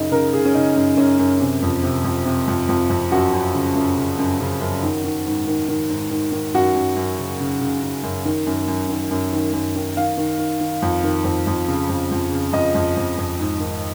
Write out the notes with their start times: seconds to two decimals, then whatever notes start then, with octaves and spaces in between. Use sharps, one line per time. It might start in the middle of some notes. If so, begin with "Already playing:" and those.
Already playing: F#2 C#3 D#4
0.12 C#3 A#4
0.33 C#3 G#4
0.45 C#4
0.55 C#3 D#4
0.76 F#2
0.97 F#2 C#4
1.19 F#2
1.40 C3
1.62 F2
1.83 C3
2.04 F2
2.26 C3
2.48 F2
2.69 F2
2.90 F2
3.11 F#2 F#4
3.33 F#2
3.54 C#3
3.75 F#2
3.97 C#3
4.19 F#2
4.40 C#3
4.61 F#2
4.83 D#3
5.04 D#3
5.26 G#2
5.47 D#3
5.69 D#3
5.90 G#2
6.11 D#3
6.32 D#3
6.55 F#2 F#4
6.75 F#2
6.96 F#2
7.18 C#3
7.40 C#3
7.61 C#3
7.82 C#3
8.03 F#2
8.25 D#3
8.47 F#2
8.68 F#2
8.89 D#3
9.11 F#2
9.33 D#3
9.53 F#2
9.76 D#3
9.97 D#3 F5
10.18 D#3
10.39 D#3
10.61 D#3
10.82 F2
11.04 D#3
11.24 F2
11.47 F2
11.68 C#3
11.89 F2
12.11 F2
12.32 C#3
12.53 F2 D#5
12.75 F2
12.97 F2
13.17 F2
13.40 G#2
13.60 D#3